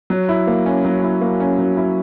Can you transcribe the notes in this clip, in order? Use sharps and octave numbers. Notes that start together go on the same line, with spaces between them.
F#3
E4
A#3
C#4
F#3
E4
A#3
C#4
F#3
E4